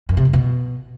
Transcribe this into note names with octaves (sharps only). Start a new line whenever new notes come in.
F#2
C3
F#2
B2